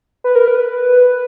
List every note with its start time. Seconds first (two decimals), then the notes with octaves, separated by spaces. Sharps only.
0.24 B4
0.35 A#4
0.48 B4